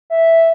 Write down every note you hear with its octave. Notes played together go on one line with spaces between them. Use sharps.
E5